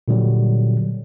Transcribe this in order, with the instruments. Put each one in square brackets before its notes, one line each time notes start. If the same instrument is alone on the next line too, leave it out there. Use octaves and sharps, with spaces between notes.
[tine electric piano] A#2 D3 F#3 G3